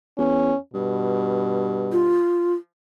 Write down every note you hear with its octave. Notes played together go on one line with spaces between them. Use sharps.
E2 C#4
G2 B2
F4